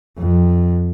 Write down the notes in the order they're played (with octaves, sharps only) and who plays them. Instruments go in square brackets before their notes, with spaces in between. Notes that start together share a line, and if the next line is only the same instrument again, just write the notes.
[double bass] F2